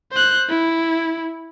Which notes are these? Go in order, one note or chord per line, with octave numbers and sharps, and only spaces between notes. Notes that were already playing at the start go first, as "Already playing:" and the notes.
C5 F#6
E4